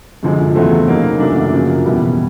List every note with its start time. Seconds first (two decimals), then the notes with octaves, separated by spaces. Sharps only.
0.23 F#2 D3 F3 G#3
0.55 E2 C#3 F#3 A3 C4
0.88 C#3 F#3 A#3 D#4
1.19 F#2 C#3 E3 A3 D4
1.52 F#2 C#3 F3 A#3
1.85 E2 B2 G3 B3 E4